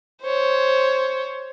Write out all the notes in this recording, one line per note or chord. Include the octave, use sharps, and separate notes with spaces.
C5 C#5